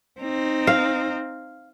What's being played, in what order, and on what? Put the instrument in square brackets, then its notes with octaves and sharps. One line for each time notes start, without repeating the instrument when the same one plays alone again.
[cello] C4 D#4
[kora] F5